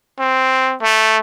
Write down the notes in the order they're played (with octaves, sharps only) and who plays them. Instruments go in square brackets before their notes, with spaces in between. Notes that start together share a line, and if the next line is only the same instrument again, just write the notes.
[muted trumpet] C4
A3